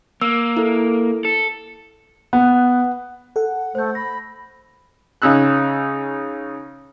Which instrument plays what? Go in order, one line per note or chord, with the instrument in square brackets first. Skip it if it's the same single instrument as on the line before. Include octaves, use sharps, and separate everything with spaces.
[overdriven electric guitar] A#3 [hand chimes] E6
[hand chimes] E4 A4
[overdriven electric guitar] A4
[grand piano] B3 [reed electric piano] F#5
[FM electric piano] A4 F#5
[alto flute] A3 [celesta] C5 G6
[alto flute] B5 [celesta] A#6
[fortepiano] C#3 C#4 D#4 E6 F#6